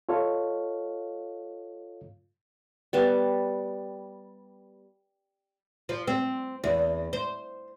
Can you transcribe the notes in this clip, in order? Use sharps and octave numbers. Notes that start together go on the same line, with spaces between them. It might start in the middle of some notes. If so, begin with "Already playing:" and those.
F4 A4 C#5 D#5 F5
G3 B3 A5
F3
C4
E2
C5